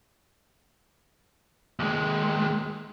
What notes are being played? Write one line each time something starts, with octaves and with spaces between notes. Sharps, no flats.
D#2 G#3